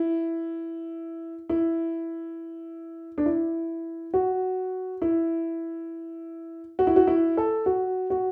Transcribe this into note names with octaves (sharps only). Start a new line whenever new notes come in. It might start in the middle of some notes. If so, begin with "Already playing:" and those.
Already playing: E4
E4
D4
E4
F#4
E4
F#4
E4
F#4
E4
A4
F#4
F#4